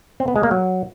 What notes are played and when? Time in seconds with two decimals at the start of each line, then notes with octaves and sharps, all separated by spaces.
0.20 C4
0.28 B3
0.36 G#3
0.43 A#3
0.51 F#3